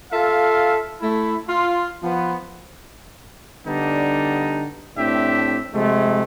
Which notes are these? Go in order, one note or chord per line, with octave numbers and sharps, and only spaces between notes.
F4 A4 E5 F5
A3 E4
F4
F3 B3
D3 G3 B3 D4 D#4
A2 C4 D4 G4 E5
C3 F3 G#3 A3